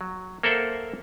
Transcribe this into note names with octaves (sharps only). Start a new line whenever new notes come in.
F#3
A#3 A4 A#4 C5 E5 F#5